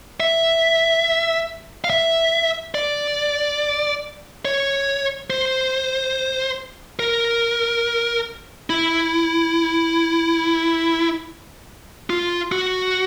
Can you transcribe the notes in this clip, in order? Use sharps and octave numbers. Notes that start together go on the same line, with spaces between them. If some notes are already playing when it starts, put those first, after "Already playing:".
E5
F5
E5
D5
C#5
C5
A#4
E4
F4
F#4